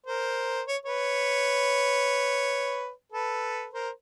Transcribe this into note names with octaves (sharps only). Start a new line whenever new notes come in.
A#4 C5
C#5
B4 C#5
A4 B4
A#4 C5